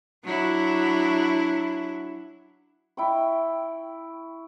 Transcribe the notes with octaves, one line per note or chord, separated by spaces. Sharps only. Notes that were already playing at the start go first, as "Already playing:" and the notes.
F#3 D4 E4
E4 G5 C#6